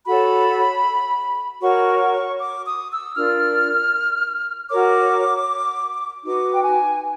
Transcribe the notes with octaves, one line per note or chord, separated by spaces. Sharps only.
F#4 A4 C#5 B5
F#4 A#4 C#5 C#6
D6
D#6
E6
D4 F4 A#4 F6
F#4 A#4 C#5 D6
D#4 F#4 B4 D6
G5
G#5